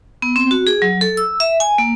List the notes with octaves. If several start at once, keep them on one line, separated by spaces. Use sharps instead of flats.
B3
C4
F#4
G#4
F#3
A4
E6
E5
G#5
A#3